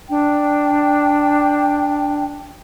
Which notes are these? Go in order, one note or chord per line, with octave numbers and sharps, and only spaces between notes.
D4 G5